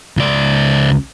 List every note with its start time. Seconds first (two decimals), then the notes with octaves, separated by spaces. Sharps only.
0.17 C#2 D5